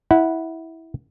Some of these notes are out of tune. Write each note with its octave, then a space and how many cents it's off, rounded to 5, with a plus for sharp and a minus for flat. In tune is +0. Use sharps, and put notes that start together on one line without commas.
E4 -15 F#5 +0